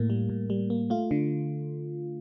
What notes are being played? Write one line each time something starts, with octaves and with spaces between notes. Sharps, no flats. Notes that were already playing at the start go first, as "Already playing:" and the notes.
Already playing: A2 A#3
G3
A2
G3
A#3
A3 F4
D3